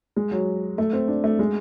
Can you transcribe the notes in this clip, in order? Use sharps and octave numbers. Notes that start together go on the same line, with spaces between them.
G#3
F#3
A3
C4
D4
A3
G#3